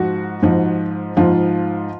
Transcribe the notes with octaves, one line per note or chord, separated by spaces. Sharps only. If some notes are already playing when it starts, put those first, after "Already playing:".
Already playing: G#2 F3 F#4
G#2 F3
G#2 F3 F4